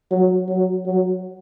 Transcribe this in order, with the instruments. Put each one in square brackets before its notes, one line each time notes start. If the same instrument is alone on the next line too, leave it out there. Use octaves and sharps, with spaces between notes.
[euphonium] F#3
F#3
F#3